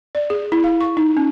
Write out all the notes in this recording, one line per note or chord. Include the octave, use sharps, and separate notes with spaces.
D5
G#4
E4
F5
C#6
D#4
C#4